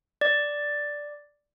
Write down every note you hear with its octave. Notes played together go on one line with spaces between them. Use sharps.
D5